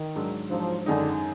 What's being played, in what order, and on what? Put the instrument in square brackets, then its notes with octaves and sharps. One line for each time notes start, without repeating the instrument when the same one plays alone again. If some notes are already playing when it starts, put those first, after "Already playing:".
Already playing: [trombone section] D#3
[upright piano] G#2 F#3 D4
[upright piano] G#2 F#3 D4 [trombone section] F3
[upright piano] F#2 D#3 G#3 D#4 [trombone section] D3